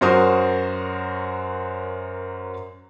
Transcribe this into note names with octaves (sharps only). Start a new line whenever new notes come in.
F#2 F#3 F#4 A#4 C5 D#6